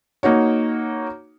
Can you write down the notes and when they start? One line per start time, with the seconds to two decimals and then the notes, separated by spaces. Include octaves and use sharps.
0.23 A#3 D#4 F#4 C#5